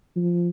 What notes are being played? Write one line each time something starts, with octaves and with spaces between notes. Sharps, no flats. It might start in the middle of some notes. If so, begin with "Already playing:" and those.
F3